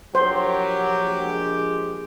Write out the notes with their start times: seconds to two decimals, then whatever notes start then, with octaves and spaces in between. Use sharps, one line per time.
0.15 A#1 F#3 G4 C5
1.23 G#3